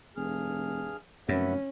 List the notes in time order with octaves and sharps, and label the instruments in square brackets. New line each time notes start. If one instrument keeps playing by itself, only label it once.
[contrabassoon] F1 [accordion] G2 G#4 F6
[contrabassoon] F1 [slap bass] F#2 [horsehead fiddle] C#4 [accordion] B4 E5 F#5